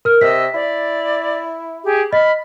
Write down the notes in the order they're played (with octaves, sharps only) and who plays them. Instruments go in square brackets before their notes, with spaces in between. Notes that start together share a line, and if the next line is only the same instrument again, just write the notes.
[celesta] A#4 F6
[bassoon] C3 [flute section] D#5 E6 [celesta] B6
[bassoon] E4 [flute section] D5
[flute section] G4 G#4
[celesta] D#5 [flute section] B5 F6